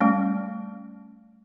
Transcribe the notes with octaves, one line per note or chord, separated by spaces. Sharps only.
G3 A3 C#4